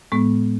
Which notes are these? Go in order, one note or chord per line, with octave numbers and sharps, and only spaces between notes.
A2 G#3 B3